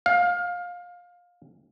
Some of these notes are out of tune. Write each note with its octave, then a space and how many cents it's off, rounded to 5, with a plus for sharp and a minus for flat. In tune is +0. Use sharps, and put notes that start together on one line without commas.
F5 +20